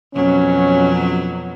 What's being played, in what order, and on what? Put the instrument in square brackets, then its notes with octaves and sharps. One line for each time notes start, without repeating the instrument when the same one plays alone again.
[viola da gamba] F2 B2 F#3 [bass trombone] C#4